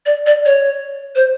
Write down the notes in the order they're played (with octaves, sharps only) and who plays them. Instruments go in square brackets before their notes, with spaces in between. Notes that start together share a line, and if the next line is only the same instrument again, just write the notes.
[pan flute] D5
D5
C#5
C5